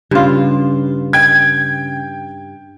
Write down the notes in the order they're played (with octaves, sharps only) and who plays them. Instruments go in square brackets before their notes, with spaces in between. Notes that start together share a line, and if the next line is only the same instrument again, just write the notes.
[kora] G2 F4 [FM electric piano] C#3 C#4
[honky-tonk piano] G5 G#6